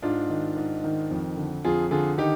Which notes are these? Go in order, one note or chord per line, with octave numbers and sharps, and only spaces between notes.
G#2 D4 F4
D#3
G#2
D#3
F2
D3
F2 F4 G#4
D3 F4 G#4
D#3 D#4 G4